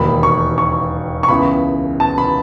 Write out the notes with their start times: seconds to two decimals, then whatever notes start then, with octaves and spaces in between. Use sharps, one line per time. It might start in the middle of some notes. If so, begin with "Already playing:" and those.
Already playing: E1 D#2 D#3 B5
0.23 C#6
0.58 C#6
1.23 C#6
1.29 C#2 C#3 E3 B3 B5
2.00 A5
2.18 B5